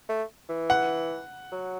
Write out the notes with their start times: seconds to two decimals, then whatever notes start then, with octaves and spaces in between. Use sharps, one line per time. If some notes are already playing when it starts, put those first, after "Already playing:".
0.09 A3
0.49 E3
0.70 F#5
1.52 F#3